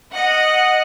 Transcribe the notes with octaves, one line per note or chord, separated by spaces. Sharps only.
D#5 F#5